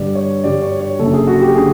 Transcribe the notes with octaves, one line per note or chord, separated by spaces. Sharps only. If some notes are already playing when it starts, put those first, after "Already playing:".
Already playing: G2 D3 G3 D5
C#5
G2 D3 G3 D5
C#5
C#5
F#1 F#2 D3 A4
G#4
F#4
G4
D3 G#4